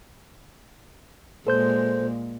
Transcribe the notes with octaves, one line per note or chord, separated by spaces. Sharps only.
A#2 G#3 A4 C5 G6